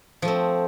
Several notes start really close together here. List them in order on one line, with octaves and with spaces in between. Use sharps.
F3 A3 C4